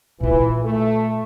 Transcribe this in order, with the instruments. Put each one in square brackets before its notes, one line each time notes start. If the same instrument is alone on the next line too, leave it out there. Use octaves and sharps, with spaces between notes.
[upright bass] A#2 F4 [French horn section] E3
[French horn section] A3